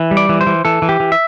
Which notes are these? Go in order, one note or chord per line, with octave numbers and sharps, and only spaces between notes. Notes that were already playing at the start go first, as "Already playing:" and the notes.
Already playing: E3
G3
D5
E3
C5
E3
E3 A4
E3
G4
E3
E5